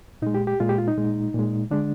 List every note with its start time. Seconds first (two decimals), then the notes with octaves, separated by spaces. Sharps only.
0.22 A#2 G#3 D#4
0.34 G4
0.47 G4
0.60 A#2 G#3 F4
0.69 G4
0.78 F4
0.88 D#4
0.97 A#2 G#3
1.34 A#2 G#3
1.71 D3 G#3 D4